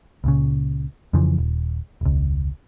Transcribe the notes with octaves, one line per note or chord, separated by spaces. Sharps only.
C#2 A#2 C#3
F2 C#3 E3 F3
D#1
E1 C#2